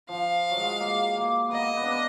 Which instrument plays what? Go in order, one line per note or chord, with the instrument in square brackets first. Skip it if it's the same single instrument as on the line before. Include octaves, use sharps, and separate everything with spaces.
[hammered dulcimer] F3 [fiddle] F5
[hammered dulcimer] F#3
G#3
A#3
A#3
[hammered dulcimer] A#3 B3 [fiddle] D#5
[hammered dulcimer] B3
D4
B3